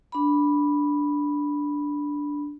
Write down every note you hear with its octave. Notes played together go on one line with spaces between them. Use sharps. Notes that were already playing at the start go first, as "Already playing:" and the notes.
D4 B5